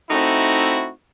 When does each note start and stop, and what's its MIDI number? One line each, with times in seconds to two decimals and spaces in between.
0.10 0.90 57
0.10 0.90 60
0.10 0.90 63
0.10 0.90 64
0.10 0.90 66